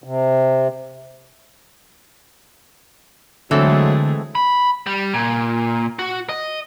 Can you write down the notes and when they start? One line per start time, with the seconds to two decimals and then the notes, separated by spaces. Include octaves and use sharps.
0.04 C3
3.51 D3 E3 F#3 G#3 A3 C4 A4
4.35 B5
4.86 G3
5.14 A#2
5.99 F#4
6.29 D#5